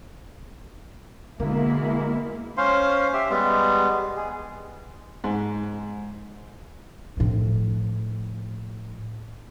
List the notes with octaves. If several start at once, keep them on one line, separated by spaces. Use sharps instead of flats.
B2 D3 G#3 A#3 E4
C#4 C5 F5 C6
G4 E5
G3 G#3 B3
G#4
G#2
A2 F3